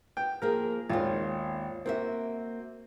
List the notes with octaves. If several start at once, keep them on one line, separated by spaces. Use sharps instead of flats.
B3 G5
F3 A#3 G#4 A#4
G#1 D#2 B3 F4
A#3 C4 F#4 E5